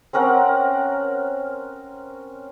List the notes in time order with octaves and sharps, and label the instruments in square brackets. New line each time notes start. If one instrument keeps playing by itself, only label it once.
[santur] C4 C#4 A#4 F#5